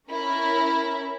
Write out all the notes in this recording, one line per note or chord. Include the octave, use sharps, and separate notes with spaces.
C#4 E4 A#4